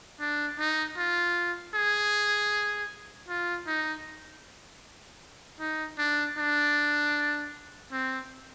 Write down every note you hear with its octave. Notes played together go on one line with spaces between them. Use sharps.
D4
D#4
F4
G#4
F4
D#4
D#4
D4
D4
C4